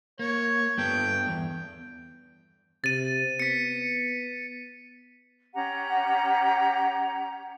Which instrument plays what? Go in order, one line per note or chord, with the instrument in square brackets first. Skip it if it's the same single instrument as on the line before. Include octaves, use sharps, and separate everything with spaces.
[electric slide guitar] A#3 [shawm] C#5
[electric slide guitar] G2 B3 A4 [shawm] G5
[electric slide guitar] E2
[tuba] C3 [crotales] A6 D#7
[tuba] B3 [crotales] B6 C#7
[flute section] C#4 G4 F#5 A#5